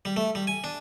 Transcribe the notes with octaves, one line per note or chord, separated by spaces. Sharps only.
G3
A3
G3
G#5
D4